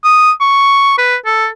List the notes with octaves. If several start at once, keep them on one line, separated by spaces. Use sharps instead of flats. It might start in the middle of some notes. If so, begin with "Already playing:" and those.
D#6
C#6
B4
A4